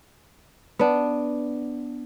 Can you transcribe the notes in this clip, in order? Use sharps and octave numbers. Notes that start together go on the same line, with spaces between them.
B3 D4